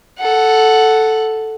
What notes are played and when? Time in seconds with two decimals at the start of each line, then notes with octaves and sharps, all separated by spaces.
0.19 A4 F#5